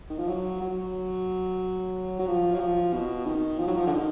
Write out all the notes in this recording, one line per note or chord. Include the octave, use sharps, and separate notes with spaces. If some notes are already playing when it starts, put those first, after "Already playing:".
D#3
F3
F#3
F#3
F#3
F3
F#3
F3
B2
D#3
F3
F#3
F3
D3
D#3